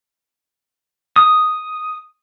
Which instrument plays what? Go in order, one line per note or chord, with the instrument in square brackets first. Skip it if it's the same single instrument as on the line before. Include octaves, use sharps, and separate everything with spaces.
[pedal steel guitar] D#6